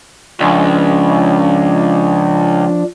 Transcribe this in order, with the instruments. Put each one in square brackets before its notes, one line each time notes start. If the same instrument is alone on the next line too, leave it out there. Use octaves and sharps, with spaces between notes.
[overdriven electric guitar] C#2 [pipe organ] F3 D4